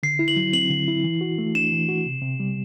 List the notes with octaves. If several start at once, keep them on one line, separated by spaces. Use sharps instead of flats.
D3 C7
E4
F#7
F#3
C4 F#7
D3
E4
E3
F#4
A3
D4 E7
E3
F#4
C3
C3
G3